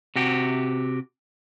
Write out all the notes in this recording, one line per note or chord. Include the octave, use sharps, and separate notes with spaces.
C3 F#4 G4